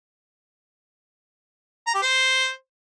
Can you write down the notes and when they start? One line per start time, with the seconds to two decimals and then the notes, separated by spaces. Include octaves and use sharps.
1.87 A#5
1.94 G4
2.02 C5